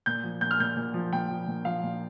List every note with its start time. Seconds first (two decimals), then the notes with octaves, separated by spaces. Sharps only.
0.06 A#2 G6
0.24 F3
0.41 A#2 G6
0.51 F6
0.60 A#2 G6
0.76 A#2
0.94 F3
1.13 A#2 G5
1.30 F3
1.47 A#2
1.65 F3 F5
1.83 A#2